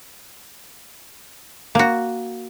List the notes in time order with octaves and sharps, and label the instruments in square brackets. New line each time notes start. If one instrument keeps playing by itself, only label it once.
[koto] A#3 F#4